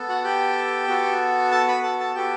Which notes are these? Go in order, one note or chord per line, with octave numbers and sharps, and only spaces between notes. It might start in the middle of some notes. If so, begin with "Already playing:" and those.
Already playing: B3 A4
F#4 F#5
G4 G5
B3 F#4 A4
A4 A5
B4 B5
A4 A5
A4 A5
B3 F#4 G4 A4 G5